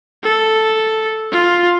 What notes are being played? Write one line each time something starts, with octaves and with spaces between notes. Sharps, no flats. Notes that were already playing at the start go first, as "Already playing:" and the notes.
A4
F4